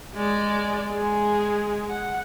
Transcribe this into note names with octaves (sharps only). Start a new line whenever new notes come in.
G#3 D5
G#3 G#4
F#5